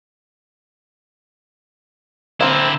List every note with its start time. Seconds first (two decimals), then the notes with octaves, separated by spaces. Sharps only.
2.41 D3 A#3 C4 E4